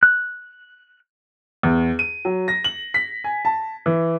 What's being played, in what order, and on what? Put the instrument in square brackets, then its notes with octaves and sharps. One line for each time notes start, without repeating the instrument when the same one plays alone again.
[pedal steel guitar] F#6
[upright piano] E2
D#7
F#3
A#6
F#7
B6
G#5
A5
E3